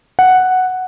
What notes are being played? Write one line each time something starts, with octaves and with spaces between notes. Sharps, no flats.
F#5